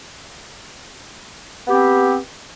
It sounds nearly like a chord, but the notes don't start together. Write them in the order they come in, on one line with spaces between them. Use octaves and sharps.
B3 G4 C4